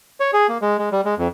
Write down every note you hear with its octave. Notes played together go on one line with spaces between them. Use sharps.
C#5
G#4
A#3
G#3
G#3
G3
G#3
F2